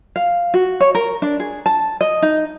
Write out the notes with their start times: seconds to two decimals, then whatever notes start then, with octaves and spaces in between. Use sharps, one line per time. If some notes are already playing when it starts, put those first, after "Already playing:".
0.16 F5
0.54 F#4
0.81 C#5
0.95 A#4
1.22 D4
1.40 G#4
1.66 A5
2.01 D#5
2.22 D#4